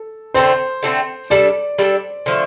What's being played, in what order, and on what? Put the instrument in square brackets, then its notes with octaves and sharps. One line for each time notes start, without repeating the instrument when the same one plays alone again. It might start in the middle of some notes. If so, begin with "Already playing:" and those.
Already playing: [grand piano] A4
[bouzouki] D3 A3 C4 [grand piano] C5
[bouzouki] D3 A3 C4
[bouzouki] G3 D4 A4 [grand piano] D5
[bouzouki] G3 D4 A4
D3 F3 A3